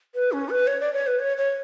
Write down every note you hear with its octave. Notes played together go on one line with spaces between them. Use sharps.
B4
C#4
B4
C#5
D5
C#5
B4
C#5
C#5